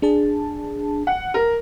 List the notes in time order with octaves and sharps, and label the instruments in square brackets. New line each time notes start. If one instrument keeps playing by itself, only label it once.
[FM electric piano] D4 G#4 A5
[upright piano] F#5
A#4